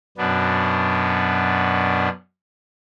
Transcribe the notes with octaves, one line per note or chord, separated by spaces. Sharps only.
F#2 B2 B3 D4